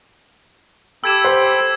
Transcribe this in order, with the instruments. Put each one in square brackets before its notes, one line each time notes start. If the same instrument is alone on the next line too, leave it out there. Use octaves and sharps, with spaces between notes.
[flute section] G4 [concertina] A4 G5 B5 [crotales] E6 G#6 E7
[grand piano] C5